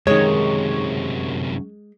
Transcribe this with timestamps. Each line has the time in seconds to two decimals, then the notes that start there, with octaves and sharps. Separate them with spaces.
0.07 F#2 C3 D#3 G#3 C#5